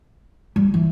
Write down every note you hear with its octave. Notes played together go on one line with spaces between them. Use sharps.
G3
E3